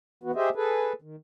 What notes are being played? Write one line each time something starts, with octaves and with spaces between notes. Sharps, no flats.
E3 B3 F#4
G4 G#4 C5 D#5 E5
G#4 A4 B4
D#3